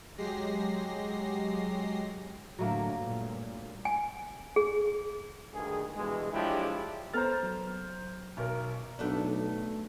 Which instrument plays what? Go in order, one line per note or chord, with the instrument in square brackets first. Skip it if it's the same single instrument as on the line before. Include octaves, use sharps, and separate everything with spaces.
[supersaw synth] F#3 G#3 G4 A#6 C7
[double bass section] A2 D3 [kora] F#3 A3 A#3
[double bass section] G2 A#2
[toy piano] G#5
G#4
[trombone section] D2 G2 D#3 G#4
G2 B2 E3 G#3
F3 F#3 G#3 D4 E4 G4
[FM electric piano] B3 A4 A6 [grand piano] C5 A#5 F6
[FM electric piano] F#3
[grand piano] B1 A#4
[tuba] B1 [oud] A3 B3 D4